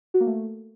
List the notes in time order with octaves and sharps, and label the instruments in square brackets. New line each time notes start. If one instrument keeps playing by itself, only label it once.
[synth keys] F#4
A#3
A3